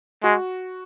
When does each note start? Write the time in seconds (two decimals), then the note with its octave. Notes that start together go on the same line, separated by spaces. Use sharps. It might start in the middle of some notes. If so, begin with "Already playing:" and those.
0.23 G#3 F#4